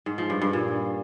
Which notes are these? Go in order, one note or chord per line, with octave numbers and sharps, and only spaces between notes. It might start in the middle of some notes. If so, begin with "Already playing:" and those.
G#2
F3
G2
G2
A#2